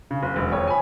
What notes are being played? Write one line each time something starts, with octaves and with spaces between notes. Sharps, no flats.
C#3
F#1
E1
F2 C#5
G#5 B5